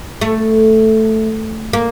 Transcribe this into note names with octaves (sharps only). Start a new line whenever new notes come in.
A3
A#3